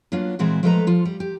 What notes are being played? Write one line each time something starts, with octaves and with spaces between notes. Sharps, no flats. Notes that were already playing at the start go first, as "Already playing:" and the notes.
F#3 A#3 B3 D4 F4
A#2 E3 G#3 C4 E4 F#4
F3 G#3 A3 A4 B4 A#5
F3 F4 A4
G3
G4